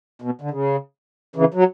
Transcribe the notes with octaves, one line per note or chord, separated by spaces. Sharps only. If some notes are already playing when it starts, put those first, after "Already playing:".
B2
D3
C#3
C#3 E3
F#3